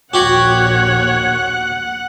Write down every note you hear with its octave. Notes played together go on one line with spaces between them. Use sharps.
A#1 D#2 A#2 F#4 G4 C#5 F#5